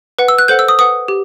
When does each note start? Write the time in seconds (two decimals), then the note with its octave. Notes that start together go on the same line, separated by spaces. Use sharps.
0.19 B4 F#5
0.28 E6
0.38 F#6
0.48 A4 C5 F#5 G6
0.59 E6
0.68 D#6
0.79 B4 F#5 D#6
1.08 G4